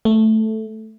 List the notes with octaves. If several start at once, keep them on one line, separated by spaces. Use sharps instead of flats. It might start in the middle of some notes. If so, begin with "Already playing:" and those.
A3